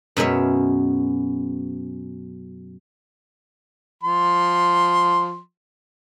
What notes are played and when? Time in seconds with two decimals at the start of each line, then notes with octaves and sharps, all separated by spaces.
0.17 F#2 B2 G#3 C#4 E5
4.03 F3 C6